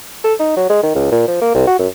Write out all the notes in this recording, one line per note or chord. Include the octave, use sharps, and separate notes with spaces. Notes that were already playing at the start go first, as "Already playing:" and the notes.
A4
D#4
F#3
G#3
D#3
C#2
A#2
F3
A#3
C2
F#4
F#2